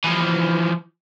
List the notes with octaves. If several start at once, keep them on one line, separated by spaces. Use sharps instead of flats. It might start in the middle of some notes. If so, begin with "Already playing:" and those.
E3 F3